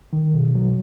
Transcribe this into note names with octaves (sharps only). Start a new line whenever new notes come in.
D#3
B2
F#3